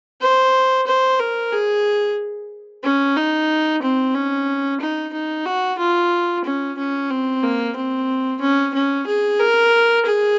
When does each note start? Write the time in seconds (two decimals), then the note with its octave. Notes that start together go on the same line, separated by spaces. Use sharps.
0.21 C5
0.87 C5
1.20 A#4
1.53 G#4
2.84 C#4
3.16 D#4
3.83 C4
4.15 C#4
4.81 D#4
5.13 D#4
5.46 F#4
5.79 F4
6.45 C#4
6.78 C#4
7.10 C4
7.43 A#3
7.76 C4
8.41 C#4
8.74 C#4
9.07 G#4
9.40 A#4
10.06 G#4